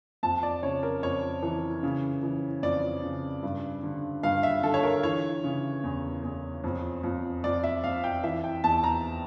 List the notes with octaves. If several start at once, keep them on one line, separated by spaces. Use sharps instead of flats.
F2 A5
D5
C#3 C#5
A#4
F2 C#5
E3
C#3
E3
F2 D5
C#3
G2
D3
G2 F5
E5
D3 A4
C#5
A#4
E3 C#5
C#3
E2
E2
F2
F2
F2 D5
E5
F2 F5
G5
E3 E5
G5
E2 A5
A#5